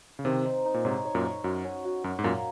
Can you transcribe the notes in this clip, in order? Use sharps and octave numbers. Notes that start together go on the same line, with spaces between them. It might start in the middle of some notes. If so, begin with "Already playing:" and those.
C#3
C3 D#3 C4
D#4
D#4
A#2
G#2 C3 C#5
C#5
F#2 A#2
C#5
F#2 F#4
C#4
F#4
F#2 C#4
G#2
F#2 A#2 A#3